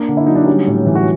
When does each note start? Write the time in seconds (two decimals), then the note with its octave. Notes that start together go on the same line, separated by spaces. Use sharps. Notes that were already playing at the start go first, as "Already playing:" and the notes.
Already playing: A#3 D4
0.09 D3
0.17 E4
0.27 F#3 D#4
0.36 D4
0.44 G3 C#4 D#4
0.67 A2
0.86 E3
0.95 F#4